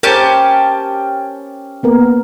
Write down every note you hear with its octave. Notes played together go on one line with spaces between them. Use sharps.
C#4 G4 A#4 C5 A5
A#3 B3 A#4